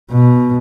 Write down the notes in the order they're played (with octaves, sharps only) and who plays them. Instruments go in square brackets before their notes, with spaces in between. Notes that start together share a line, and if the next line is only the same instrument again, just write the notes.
[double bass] B2